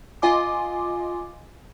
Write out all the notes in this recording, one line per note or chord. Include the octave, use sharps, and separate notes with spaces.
F4 D#5 G#5 C6 D6